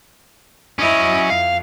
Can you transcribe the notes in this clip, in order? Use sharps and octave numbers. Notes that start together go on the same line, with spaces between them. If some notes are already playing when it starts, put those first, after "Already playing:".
F#3 C#4 E4 D#5
F2 F5